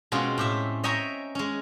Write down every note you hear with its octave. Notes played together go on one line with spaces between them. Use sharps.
B2 G#3 C4 C#4 F4
A2 G4 E5
C#5 D#5 E5 G5 G#5 A#5
G#3 C#4